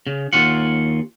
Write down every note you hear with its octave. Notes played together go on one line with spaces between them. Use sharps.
C#3
D#2 C#4 F4 F#5